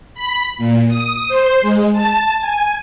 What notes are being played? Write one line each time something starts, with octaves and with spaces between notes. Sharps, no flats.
B5
A#2
D#6
C5
G#3
A5
G#5